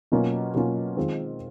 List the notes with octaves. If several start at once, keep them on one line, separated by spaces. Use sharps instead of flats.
B2 F#3 A#3 C#4 F4
B2 F#3 A#3 C#4 F4
D#3 G#3 C4 F4